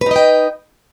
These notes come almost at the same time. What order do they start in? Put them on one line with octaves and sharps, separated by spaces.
B4 D#4 D#5 G5